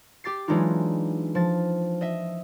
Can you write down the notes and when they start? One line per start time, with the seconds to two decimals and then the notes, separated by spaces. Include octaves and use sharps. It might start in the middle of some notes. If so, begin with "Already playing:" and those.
0.24 G4 D6 A6 C7
0.48 E3 F#3 G#3 D4 D#4 F4
1.35 F3 A6
2.01 D#5 E5